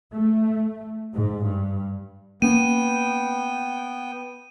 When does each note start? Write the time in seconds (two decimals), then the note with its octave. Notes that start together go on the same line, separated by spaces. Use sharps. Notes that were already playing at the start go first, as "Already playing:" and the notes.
0.13 A3
1.14 G#2
1.44 G2
2.42 A#3 B3 C#4 G5 D#7